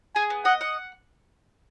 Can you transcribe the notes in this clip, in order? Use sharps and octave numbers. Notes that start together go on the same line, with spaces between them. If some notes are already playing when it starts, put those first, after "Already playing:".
G#4 G#5
B3
D#5 F#5
F#5